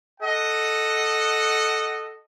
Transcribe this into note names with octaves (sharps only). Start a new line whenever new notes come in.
A4 D#5 F#5